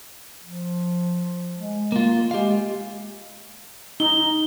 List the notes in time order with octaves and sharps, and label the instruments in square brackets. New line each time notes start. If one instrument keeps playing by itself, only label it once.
[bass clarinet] F3
G#3
[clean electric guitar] A#3 F4
[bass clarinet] G#3 [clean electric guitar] G4 F5
[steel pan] D#4 [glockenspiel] G7